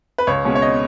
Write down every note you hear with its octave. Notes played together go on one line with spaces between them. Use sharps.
B4
C#2 C#5
B2 G#3 C#4
C#5
D#5